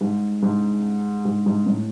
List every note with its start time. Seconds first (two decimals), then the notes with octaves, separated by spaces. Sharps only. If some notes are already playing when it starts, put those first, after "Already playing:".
0.01 G#2
0.43 G#2
1.25 G#2
1.46 G#2
1.66 A2